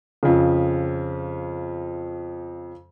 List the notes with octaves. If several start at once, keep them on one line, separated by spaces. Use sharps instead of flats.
F2 C#3